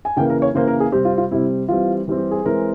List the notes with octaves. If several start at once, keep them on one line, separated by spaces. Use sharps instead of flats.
G#5
C#3 E3 A#3 G5
A#4
C#5
C#3 E3 A#3 C5
A#4
G#4
C3 G3 C4 G4
F4
F4
C3 G3 C4 E4
E3 G3 C4 F4
E3 G3 C4
G4
G#4
E3 G#3 C4 A#4